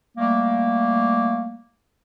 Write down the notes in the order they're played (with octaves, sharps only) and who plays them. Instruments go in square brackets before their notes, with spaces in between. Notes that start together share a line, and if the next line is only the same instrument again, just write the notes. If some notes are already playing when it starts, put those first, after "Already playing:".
[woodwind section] G3 A3 A#3